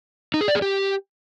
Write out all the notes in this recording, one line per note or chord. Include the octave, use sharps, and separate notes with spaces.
D#4
G#4
D5
G#4
G4